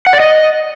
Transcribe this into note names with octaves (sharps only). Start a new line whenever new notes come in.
F#5
D5
D#5